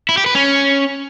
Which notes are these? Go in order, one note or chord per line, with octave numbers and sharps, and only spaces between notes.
E4
G4
B4
C#4